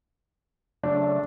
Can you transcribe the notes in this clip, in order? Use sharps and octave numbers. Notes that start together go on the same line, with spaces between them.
C#3 F#3 A3 D4